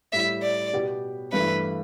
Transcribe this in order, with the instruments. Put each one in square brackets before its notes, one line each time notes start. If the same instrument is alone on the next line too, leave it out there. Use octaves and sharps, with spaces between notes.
[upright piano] A2 G3 E4 [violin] E5
[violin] D5
[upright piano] B2 B3 G4
[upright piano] G2 E3 A3 E4 [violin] B4